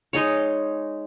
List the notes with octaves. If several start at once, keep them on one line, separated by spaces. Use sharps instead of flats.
G#3 D#4 G#4 C#5